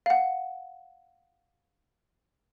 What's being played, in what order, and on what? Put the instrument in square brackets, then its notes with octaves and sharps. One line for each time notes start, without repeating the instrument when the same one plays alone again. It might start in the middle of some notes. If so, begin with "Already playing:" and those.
[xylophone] F5 F#5